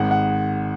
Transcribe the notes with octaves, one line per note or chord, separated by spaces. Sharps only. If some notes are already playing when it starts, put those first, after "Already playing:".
Already playing: G#1 G#2 D#3 F#5
F#5